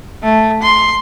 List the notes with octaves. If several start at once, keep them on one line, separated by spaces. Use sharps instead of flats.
A3
C6